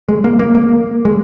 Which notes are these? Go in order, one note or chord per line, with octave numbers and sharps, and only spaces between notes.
G#3
A#3
A#3
A#3
G#3